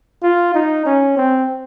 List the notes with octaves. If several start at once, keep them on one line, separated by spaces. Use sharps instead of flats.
F4
D#4
C#4
C4